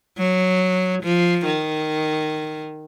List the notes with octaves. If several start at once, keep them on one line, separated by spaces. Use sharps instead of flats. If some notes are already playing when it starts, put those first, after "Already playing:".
F#3
F3
D#3